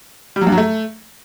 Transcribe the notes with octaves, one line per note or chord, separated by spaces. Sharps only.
G3
F#3
G2
F#3
A3